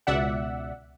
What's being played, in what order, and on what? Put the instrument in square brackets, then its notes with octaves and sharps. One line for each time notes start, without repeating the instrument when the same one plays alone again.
[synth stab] C#2 B2 D5 E5 F#5